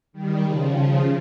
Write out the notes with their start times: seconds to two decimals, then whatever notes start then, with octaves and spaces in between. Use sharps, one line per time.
0.13 D#3 G3
0.43 C#3 F3
0.73 C#3 F3